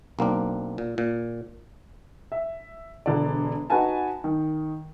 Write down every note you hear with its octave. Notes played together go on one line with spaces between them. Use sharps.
B1 A#3 C4 D4
A#2
A#2
E5
E1 D3 D5
D#4 F#4 B4 F#5 G#5 A5
D#3